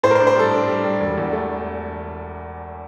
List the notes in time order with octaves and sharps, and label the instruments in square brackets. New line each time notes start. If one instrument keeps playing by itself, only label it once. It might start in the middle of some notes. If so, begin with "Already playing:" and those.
[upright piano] A2 C5
A#4
C5
D4
C5
G3 A4
D4
G3
G3
E1
E2
A3